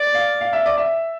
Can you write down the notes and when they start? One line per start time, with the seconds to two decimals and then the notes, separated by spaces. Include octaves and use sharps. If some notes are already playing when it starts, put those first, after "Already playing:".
Already playing: D5
0.15 F5
0.41 F5
0.53 E5
0.66 D5
0.77 E5